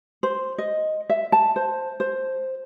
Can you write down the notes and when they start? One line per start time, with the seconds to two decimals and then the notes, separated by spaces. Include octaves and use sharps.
0.23 C5
0.58 D#5
1.10 E5
1.32 A5
1.56 C5
2.00 C5